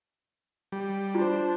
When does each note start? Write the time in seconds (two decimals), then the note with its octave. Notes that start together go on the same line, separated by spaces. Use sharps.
0.72 G3
1.15 D4 F4 C5